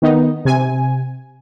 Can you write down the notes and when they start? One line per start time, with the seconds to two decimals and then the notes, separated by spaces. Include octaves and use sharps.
0.02 D#3 B3 D#4
0.45 C3 G#5